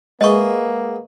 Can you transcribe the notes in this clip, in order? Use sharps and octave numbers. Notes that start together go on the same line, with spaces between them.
G#3 A#3 B3 G#4 D#5 E5 C#6